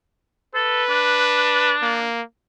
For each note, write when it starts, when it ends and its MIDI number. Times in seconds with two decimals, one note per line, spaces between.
0.55 0.84 69
0.55 1.75 71
0.90 2.08 62
1.82 2.22 58